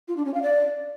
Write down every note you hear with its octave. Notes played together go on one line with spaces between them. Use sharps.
F4
D4
C#4
F5
D5